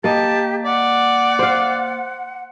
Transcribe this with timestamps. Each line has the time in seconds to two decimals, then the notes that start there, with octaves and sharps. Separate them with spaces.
0.04 A#3 G4 D#5 A5
0.65 D5 F#5
1.39 C5 F5